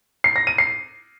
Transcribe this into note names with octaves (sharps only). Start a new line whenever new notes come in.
C7
A#6
D#7
C7